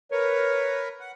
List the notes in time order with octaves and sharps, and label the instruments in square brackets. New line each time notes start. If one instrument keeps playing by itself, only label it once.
[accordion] A#4 B4 [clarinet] C#5
[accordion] F#5